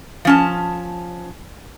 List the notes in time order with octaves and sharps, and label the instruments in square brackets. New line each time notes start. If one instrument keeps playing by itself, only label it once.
[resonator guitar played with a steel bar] F3 C#4 A5